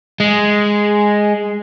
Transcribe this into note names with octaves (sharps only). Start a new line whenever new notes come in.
G#3